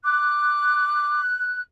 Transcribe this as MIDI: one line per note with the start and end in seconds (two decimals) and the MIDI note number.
0.04 1.21 86
0.04 1.60 90